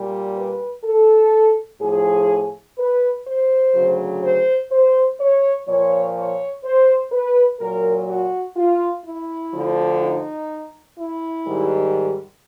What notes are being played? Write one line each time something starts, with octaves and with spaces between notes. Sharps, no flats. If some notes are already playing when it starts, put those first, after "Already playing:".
Already playing: A#2 G3
B4
A4
A2 F3 G#4
B4
C5
D2 C#3 F#3
C5
C5
C#5
A#2 F3 C#5
C#5
C5
B4
A#2 F#3 A#4
F#4
F4
E4
D2 D3 F3
D#4
E4
G#2 D#3 G3